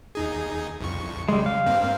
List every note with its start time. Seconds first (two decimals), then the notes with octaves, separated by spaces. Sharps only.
0.15 D#2 D#4 G#4
0.81 C2 F2 C#6
1.29 C#3 G3 G#3
1.46 F5
1.66 G2 A#3 C4